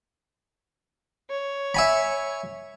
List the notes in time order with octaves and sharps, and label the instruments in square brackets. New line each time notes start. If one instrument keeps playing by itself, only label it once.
[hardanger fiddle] C#5
[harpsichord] E5 G#5 B5